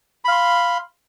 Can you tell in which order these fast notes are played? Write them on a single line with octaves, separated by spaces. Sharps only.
B5 F5 C6